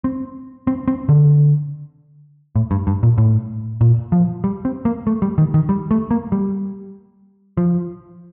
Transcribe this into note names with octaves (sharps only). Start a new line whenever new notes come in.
C4
C4
C4
D3
A2
G2
G2
A#2
A2
A#2
F3
G3
C4
A#3
A3
G3
D#3
D#3
G3
A3
A#3
G3
F3